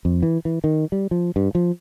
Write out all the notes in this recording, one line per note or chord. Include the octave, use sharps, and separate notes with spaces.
F2
E3
E3
D#3
G3
F3
G2
F3